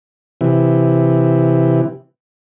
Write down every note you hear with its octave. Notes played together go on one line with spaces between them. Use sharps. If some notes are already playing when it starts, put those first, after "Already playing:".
C3 E3